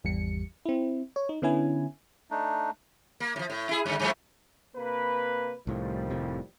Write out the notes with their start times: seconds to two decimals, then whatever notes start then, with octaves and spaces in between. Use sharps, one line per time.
0.04 G#1 E2 G3 C#7
0.66 C4 E4
1.16 C#5
1.29 D#4
1.42 D3 B3 C#4 E4 G#5
2.31 A3 D4 D#4
3.20 A#3
3.36 A2 F3
3.50 A2
3.69 E4 G#4
3.86 G2 D3
3.99 G2 F3 A3
4.76 C3 A#3 B4
5.67 C2 A2 D#3 F3 G3
6.10 F1 A2 C3